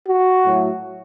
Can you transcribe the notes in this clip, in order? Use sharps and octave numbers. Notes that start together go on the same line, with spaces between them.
F#4
A2 F#3 A3